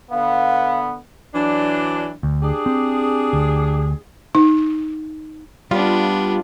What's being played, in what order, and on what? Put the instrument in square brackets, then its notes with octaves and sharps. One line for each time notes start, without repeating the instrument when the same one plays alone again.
[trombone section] D3 B3 [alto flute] F5
[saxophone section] E3 F#3 D4
[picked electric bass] D2
[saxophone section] D4 G4 G#4
[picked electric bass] C4
D2
[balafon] D#4
[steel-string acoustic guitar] G3 [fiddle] B3 D4 [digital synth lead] F4